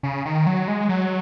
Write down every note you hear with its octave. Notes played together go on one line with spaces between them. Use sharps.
C#3
D#3
F#3
G#3
F#3